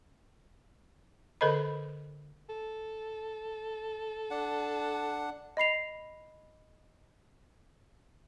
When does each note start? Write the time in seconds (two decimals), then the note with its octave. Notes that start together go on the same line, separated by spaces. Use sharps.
1.41 D3 A4 A#4 C5 D#5 B5
2.49 A4
4.31 D4 F#5
5.57 D#5 B5 C7 F7